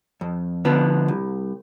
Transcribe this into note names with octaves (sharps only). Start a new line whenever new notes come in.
F2
D3 F3 B3
C2